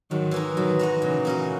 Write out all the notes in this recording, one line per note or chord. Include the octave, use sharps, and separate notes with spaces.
G#2 D#3 F#3
E3 G#3 D#4
B2 D#3 F#3
G#3 D#4 F#4
A#2 C#3 E3
A#3 C#4 F#4